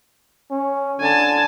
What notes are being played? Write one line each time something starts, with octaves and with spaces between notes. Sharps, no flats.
C#4
D3 G#5 A5